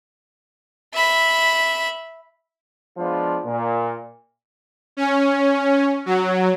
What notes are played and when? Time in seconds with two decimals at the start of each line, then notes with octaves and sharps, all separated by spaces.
0.93 E5 B5
2.97 F3 G#3 B3 D4 F4
3.44 A#2
4.97 C#4
6.06 F#3